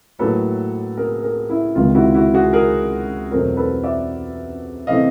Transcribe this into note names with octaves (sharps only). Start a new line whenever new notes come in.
A2 F#3 A#3 A4 B4
G#4 A#4
G#4 A#4
E4
C#2 C3 D#3 G#3 F4
E4 F#4
E4 F#4
F#4 G#4
G#4 A#4
E2 B2 F#3 A3 C4 A#4 C5
A4 B4
D5 E5
C3 E3 A3 C4 D#5 F5